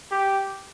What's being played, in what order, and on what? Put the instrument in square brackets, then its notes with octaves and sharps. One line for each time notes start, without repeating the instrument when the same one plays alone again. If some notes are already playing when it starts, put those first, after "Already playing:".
[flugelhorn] G4